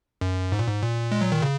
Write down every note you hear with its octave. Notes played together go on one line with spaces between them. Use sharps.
F#2
G#2
A#2
G#2
A#2
G#3
F#3
D#3
C#3